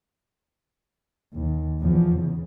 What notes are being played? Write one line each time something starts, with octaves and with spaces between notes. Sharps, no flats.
D#2
E2 F3
E2 C#3